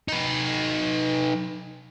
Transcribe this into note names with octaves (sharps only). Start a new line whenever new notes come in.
D#4 B4